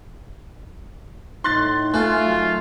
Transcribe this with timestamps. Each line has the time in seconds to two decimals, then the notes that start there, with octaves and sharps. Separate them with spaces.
1.44 A2 D#4 C6 F#6 A6
1.94 A3 F4 G#5 F#6
2.25 D#3 F#3